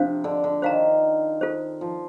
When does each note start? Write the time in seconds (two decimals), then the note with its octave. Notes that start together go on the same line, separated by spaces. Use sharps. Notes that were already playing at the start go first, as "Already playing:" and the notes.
Already playing: C3 F3 D4 F4 C5 F5
0.24 D3
0.44 D3
0.62 D#3 C5 F5 A#5
1.41 F4 A4 C5
1.81 F3